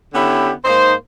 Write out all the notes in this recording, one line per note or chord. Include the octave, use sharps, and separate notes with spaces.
D3 B3 C#4 E4 G4
G#2 A#3 D#4 C5